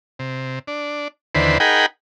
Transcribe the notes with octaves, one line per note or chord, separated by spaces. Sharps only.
C3
D4
D#2 D3 E3 B4 C5
D#4 G#4 A#4 F#5 G5 B5